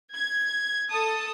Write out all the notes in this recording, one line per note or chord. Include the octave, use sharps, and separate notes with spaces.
G#6
A4 A5 D#6